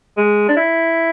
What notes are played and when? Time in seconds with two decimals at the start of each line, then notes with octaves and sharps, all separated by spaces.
0.17 G#3
0.48 D4
0.57 E4